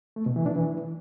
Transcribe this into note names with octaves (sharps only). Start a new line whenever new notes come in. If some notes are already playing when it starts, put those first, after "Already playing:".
A3
B2
E3
D4
E3